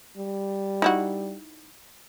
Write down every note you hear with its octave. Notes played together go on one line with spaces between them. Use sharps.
G3
D#4 E4 F#4